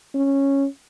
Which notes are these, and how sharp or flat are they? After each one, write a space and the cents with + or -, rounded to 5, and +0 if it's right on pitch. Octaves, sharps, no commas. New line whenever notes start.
C#4 -10